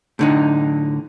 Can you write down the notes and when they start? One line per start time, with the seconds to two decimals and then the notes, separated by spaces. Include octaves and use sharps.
0.19 A2 D3 D#4